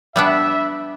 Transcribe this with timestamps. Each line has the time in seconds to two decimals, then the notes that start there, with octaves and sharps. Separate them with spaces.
0.16 G3 B3 D4 E5